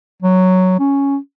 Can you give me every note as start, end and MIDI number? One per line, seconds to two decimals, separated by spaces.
0.22 0.76 54
0.80 1.17 61